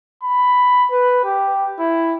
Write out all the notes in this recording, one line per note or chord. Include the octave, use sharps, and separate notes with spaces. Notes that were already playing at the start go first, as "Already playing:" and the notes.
B5
B4
G4
E4